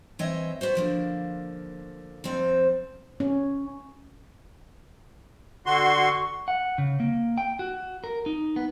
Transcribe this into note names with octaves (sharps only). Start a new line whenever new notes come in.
E3 C4 C#5 D#5 E5
B3 F#4 C5
D3 F3 A#3
F2 F3 C4 C5
C#4
D3 F#4 C6 C#6
F#5
C#3
A#3
G5
F#4
A#4
D#4
B3